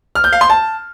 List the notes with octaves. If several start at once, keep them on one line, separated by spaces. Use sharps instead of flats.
F6
G6
F5
C6
A5